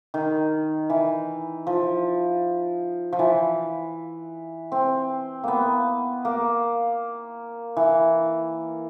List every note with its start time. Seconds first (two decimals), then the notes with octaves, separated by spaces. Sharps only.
0.14 D#3
0.90 E3
1.67 F3
3.13 F3
3.19 E3
4.72 C4
5.44 A#3 B3
6.25 A#3
7.77 E3